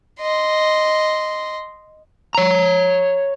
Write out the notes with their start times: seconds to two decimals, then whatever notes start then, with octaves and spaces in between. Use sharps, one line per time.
0.21 D#5 C6
2.35 C#5 A#5